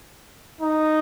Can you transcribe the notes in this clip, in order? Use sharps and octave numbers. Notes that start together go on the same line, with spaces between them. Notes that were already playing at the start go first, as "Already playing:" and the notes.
D#4